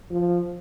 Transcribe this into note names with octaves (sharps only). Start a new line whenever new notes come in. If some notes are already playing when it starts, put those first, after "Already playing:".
F3